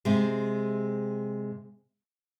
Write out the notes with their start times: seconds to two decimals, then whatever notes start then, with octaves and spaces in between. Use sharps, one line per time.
0.05 C3 G#3